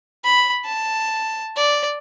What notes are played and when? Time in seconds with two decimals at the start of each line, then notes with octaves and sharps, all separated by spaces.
0.24 B5
0.65 A5
1.56 D5